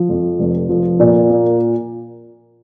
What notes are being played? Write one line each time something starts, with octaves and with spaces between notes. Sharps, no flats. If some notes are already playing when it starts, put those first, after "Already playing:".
Already playing: F3
F2
F1
F3
A#2
A#3